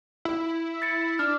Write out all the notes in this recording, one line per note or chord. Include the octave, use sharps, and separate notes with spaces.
E4
A6 C#7
D4 F6